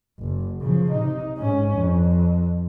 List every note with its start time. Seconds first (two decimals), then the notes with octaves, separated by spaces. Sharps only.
0.20 F#1
0.61 C#3 F3
0.92 C3 D#4
1.37 G#2 C#4
1.76 F2